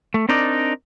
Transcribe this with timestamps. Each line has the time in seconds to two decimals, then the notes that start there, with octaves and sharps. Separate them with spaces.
0.14 A3
0.29 C4 D4 D#4 A#4 D5